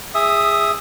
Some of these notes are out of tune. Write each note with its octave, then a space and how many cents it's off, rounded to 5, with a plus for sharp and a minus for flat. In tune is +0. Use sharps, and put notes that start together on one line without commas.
G#4 -20 E5 +0 D#6 +0